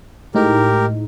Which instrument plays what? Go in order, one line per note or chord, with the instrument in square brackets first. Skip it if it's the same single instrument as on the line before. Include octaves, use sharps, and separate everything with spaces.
[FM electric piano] A2 G#3 D#4 [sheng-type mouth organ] G4 A#4